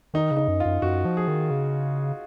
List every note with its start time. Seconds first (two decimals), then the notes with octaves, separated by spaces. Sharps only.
0.14 D#3 D#4
0.31 C#3
0.37 D#4
0.48 F#2
0.60 F4
0.65 F#2
0.82 F#2 F#4
1.05 F3
1.17 G#4
1.28 D#3
1.51 C#3